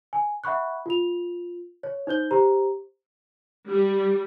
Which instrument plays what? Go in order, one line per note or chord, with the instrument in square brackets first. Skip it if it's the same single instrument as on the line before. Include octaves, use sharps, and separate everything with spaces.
[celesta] G#5
E5 F#5 B5 C#6 F#6
F4 F7
C#5
D#4 C5 G6 G7
G4 C5 A#5
[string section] G3